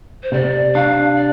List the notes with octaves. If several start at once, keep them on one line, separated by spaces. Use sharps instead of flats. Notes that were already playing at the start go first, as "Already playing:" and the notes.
C5
C3 D5
D4 F5
D5